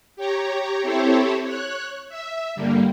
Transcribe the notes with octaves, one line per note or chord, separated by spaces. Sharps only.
G4 C#5 A#5
C4 E4 G4 A4 C5 C#5
C#5 F#6
E5
G2 D3 G3 A#3